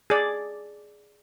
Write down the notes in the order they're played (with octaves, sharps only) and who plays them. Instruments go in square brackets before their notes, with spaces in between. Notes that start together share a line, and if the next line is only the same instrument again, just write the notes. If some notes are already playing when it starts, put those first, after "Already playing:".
[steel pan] G#4 D5